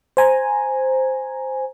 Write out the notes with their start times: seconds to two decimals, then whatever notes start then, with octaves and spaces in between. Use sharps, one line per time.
0.17 C5 G#5 A#5